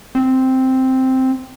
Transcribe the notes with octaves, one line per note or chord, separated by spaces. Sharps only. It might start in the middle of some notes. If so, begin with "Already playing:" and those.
C4